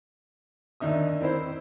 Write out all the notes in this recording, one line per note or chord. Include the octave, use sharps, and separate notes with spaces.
D#2 D4 D#4 E5 D#6
D#3 C4 E4 C5